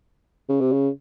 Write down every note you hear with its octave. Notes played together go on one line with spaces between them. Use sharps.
C#3
C3
C#3